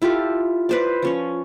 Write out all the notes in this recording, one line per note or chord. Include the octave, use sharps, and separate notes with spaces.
E4 F4 G4 A4
B4 C5 D5
F3 C#4 C#5